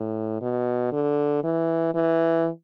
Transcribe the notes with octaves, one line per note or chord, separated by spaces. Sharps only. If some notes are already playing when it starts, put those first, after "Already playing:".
Already playing: A2
B2
D3
E3
E3